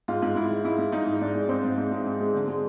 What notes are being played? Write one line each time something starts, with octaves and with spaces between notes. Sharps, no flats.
G#2 F4
G#2
G#2 E4
G#2
G#2 E4
G#2
G#2 D#4
G#2
G#2 D4
G#3
G#2 C4
G#2
G#2
G#3
G#2
G#3
D3
G#3